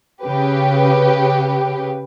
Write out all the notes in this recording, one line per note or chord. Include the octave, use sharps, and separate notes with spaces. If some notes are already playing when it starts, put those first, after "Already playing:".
C#3 G4 B4